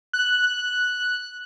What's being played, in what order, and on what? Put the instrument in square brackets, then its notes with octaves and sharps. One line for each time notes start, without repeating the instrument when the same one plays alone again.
[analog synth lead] F#6